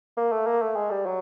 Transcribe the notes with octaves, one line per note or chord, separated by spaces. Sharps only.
A#3
A3
A#3
A3
G#3
G3
F#3